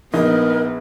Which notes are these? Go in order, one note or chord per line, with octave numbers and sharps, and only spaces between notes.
A#1 B3 D#4 A#4